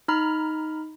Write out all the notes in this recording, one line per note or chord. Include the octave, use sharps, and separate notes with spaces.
D#4 A#5 B5 F6